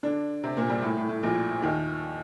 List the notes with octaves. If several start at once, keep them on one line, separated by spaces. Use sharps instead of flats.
D3 D4
C3 C4
A#2 A#3
G2 G3
A2
A2
A2
A#1 A#2
D#2 D#3